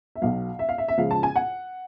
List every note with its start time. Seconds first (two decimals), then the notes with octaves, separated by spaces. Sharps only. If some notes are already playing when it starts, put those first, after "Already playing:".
0.16 E5
0.22 B1 B2 F#3 F5
0.59 E5
0.69 F5
0.78 E5
0.88 E5
0.97 C#2 C#3 F3 F5
1.11 A5
1.23 G#5
1.36 F#5